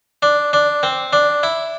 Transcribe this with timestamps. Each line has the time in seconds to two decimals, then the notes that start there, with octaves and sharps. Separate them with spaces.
0.23 D4
0.53 D4
0.83 C4
1.13 D4
1.43 E4